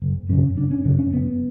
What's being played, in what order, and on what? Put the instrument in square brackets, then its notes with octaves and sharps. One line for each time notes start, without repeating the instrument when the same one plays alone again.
[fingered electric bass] F#1
F#2 C#3 C#4
F#1 D4
C#4
F#2 C#3 D4
C#4
F#1 B3